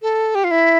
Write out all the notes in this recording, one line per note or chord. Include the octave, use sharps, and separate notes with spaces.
A4
G4
F4
E4